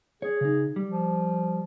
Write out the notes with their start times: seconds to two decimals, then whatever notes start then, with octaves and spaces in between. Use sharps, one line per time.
0.22 G#4 C#5
0.41 C#3 D#4
0.76 G3
0.88 F3